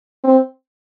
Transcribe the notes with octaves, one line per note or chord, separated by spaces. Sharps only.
C4